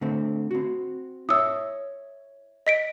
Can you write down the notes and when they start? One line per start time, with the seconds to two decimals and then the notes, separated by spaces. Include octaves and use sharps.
0.01 D3 A3 C4
0.51 C4 F#4
1.29 E4 C#5 E5 D#6 E6
2.67 D#5 B6 D7